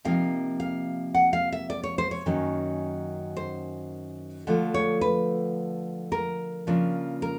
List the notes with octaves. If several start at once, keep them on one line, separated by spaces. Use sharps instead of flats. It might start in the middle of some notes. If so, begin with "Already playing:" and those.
C3 F3 A#3 D#4 F5
F5
F#5
F5
E5
D5
C#5
C5
C#5
F#2 D#3 F#3 A#3 C#4
C5
D3 F3 A3 D4 F4
C#5
B4
A#4
C#3 F3 A#3 D4 F4
A#4